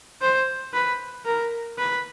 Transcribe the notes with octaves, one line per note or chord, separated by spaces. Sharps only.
C5
B4
A#4
B4